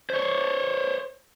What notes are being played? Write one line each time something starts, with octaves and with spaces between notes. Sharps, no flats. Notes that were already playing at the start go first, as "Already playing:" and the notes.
C5 C#5